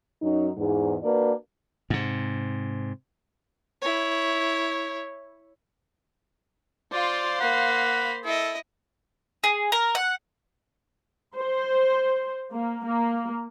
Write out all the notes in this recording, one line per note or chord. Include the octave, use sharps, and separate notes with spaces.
F#2 F#3 C#4 D#4
E2 G#2
A#3 D4 F#4 B4 D5
G#2 C3
E4 C#5
F4 C5 D5 F5
A#3 F#5 B5
E4 A4 D#5
G#4
A#4
F#5
C5
A#3
A#3